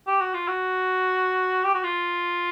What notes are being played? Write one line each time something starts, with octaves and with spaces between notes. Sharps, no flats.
G4
F#4
F4
F#4
G4
F#4
F4